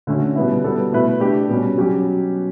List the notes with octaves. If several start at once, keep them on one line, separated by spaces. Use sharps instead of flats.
D3 A3 C#4 F#4
B2 G3 B3 E4
G3 B3 F#4 A4
B2 A3 E4 B4
A3 D4 G4
B2 G3 C#4
F#3 C#4 G4